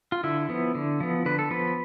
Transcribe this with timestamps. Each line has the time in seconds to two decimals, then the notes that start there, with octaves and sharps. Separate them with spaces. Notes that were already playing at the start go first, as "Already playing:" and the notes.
0.12 F4
0.24 D3 E4
0.49 F3 B3
0.75 D3
1.00 F3 B3
1.26 D3 B4
1.39 A4
1.51 F3 B3 B4